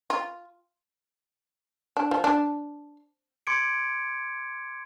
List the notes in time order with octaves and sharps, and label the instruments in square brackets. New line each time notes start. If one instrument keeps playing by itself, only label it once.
[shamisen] F4
D4
F3
D4
[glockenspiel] C6 D6 G#6 C#7 D7